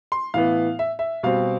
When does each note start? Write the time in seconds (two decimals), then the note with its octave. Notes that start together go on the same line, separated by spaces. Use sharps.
0.12 C6
0.34 A2 E3 B3 F5
0.79 E5
0.99 E5
1.23 B2 G3 C4 F5